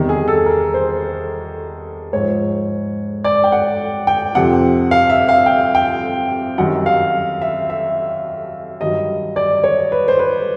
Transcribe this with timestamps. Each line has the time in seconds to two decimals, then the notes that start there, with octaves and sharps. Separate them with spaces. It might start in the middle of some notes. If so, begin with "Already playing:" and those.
Already playing: E2 C3 D#3 G3
0.09 G#4
0.28 A4
0.46 A#4
0.74 C5
2.13 G#2 F3 C#5
3.24 D5
3.44 G5
3.52 F#5
4.07 G5
4.35 F2 C3 F3 F#5
4.91 F5
5.10 E5
5.28 F5
5.46 G5
5.75 G5
6.58 F#2 D#3 G3 F#5
6.86 F5
7.41 E5
7.70 E5
8.81 G2 D#3 F#3 D#5
9.36 D5
9.64 C#5
9.92 B4
10.08 C5
10.19 B4